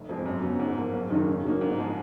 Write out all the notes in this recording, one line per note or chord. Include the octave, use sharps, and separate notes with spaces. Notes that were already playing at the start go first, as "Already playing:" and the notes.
Already playing: F1
F2 F3 G#3
F#2
C#3 F#3 B3
G#2
F3 A#3
F#1
F#2 D#3 A#3 D#4
C#3
F#3 A#3 D#4
G#2
F3 G#3